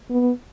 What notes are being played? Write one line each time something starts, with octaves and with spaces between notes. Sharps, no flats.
B3